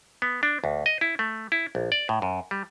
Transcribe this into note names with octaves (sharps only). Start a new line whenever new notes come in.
B3
D4
D2
D#5
E4
A3
E4
A#1
D5
A2
F#2
G3